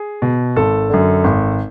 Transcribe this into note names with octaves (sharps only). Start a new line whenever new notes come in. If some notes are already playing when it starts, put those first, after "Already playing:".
Already playing: G#4
B2
G#1 A4
F#2 D3
G#1